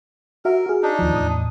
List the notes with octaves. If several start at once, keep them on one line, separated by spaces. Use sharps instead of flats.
F#4 A#4 E5
F#4 G#4
D4 D#4
D#2 F3
E2 A2 D#6